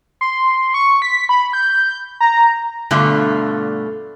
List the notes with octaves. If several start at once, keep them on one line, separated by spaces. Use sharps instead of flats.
C6
C#6
B6
B5
G6
A#5
G2 B2 D3 A3 F4